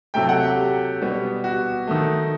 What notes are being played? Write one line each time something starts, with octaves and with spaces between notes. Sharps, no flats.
C3 F#3 A3 G5
F#5
G4
B2 G3 B3
F#4
D#3 A3